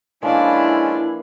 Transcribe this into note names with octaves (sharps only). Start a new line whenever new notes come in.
E3 F3 G#3 A#3 C#4 D4 E4 F4